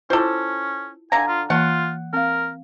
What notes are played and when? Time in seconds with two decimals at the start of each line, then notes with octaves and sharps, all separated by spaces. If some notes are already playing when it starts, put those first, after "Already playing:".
0.10 C#4 E4 F4 A4 C5 D6
1.12 D3 F5 G#5 A#5
1.28 F4
1.50 E3 A#3 F4 F#5 A5
2.13 C4 A#4 F5